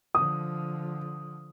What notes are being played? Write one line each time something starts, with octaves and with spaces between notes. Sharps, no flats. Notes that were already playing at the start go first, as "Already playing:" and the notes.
D3 F3 D#6